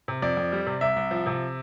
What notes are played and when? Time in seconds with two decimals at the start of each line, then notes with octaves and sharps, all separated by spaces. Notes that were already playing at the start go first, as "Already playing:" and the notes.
0.08 C3
0.22 F2 D5
0.37 F2
0.52 G3
0.67 C3
0.81 C2 E5
0.96 C2
1.11 F3
1.26 C3